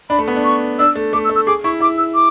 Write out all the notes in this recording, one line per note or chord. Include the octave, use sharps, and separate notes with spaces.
D4 B5
A3
B3
D4
C#6
D4 E6
A3
A3 D6
E6
A3
E6
G#4 D6
E4 C#6
E4 D6
E6
D6